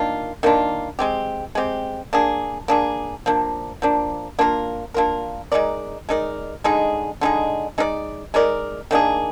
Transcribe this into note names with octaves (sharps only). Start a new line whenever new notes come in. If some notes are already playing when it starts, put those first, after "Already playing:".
Already playing: D#3 A#3 D4 F4
D#3 A#3 D4 F4
G#3 C4 G4
G#3 C4 G4
A#3 D4 G#4
A#3 D4 G#4
F3 A#3 D4
F3 A#3 D4
A#3 D4 F4 A#4
A#3 D4 F4 A#4
G#3 D#4 A#4 D5
G#3 D#4 A#4 D5
D3 G#3 D#4 G#4
D3 G#3 D#4 G#4
G#3 D#4 A#4 D5
G#3 D#4 A#4 D5
D#3 A#3 D4 G#4